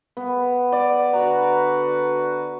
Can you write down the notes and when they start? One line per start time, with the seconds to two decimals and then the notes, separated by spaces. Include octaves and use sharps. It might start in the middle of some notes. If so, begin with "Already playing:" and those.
0.17 B3
0.72 D5
1.13 D3 F#4 B4 A#5